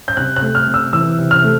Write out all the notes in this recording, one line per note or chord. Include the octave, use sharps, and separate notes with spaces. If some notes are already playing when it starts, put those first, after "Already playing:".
G6
C3 F#6
F#6
A3
F6
C3
E6
E3 E6
C3
F6
A3